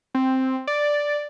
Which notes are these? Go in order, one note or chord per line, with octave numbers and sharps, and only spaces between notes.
C4
D5